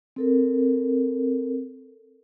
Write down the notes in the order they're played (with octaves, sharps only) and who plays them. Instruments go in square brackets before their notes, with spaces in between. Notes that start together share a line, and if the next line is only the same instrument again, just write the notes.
[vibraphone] C4 A4 A#4